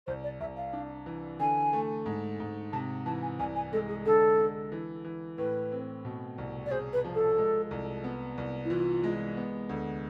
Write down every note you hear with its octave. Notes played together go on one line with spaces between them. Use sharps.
C2 C5
D5
C2 E5
F5
D4
E3
D3 G#5
A3
G#2
G#2
C3 A5
E3 A5
G#5
C2 G#5
G#5
G#3 A4
G#4
D3 A4
D3
E3
E3
A2 B4
C4
B2
C2
D5
G#4 C5
B4
F3
A4
G#3
C2
B3
C2
E4
E3 F4
G#3
B3
D2